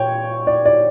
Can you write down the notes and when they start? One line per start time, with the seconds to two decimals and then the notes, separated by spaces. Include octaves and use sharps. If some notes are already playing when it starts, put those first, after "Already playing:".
Already playing: A#2 C#5 G5
0.47 D5
0.65 D5